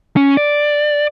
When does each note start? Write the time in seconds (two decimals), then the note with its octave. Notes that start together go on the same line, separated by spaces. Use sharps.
0.16 C#4
0.37 D5